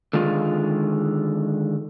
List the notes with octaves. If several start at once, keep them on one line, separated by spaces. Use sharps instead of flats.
D3 D#3 G#3 F4